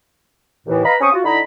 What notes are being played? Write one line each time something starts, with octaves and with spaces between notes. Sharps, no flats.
D#2 A2 E3
B4 D#5 F5 A#5 B5
C4 C#4 C5 C#6 D#6
F4 F#4
D3 D#4 E4 D#5 A#5 B5